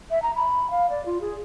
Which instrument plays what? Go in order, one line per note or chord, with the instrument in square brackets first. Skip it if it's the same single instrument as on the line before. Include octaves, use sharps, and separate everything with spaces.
[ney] E5
A#5
B5
F5
D5
F4
G#4